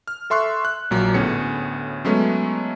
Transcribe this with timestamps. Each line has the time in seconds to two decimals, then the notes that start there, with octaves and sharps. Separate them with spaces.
0.07 F6
0.30 A4 E5 C6 C#6 F#6
0.65 F#6
0.91 A#1 A#2 F#3
1.14 D2 A2 B3 C#4 G#4 C#7
2.05 F#3 G#3 A3 B3 C#4